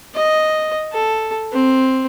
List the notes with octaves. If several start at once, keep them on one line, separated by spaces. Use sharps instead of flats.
D#5
A4
C4